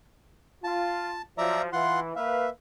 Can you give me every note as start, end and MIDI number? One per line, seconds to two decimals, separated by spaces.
0.64 1.17 65
0.64 1.22 81
1.38 1.67 53
1.38 1.67 54
1.38 1.62 74
1.38 1.62 76
1.38 1.62 82
1.73 2.11 52
1.73 2.00 65
1.73 2.00 78
1.73 2.00 84
2.16 2.47 58
2.16 2.47 71
2.16 2.50 76
2.16 2.47 77